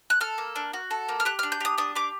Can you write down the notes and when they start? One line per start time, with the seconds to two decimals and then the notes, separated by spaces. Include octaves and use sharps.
0.10 F#6
0.21 A4 F6
0.38 A#3
0.56 D4
0.73 F#4
0.91 A4
1.09 A#3
1.20 F6
1.25 G4 F#6
1.39 F6
1.43 D4
1.52 G6
1.61 G4 D#6
1.78 D4 D#6
1.96 G4 D6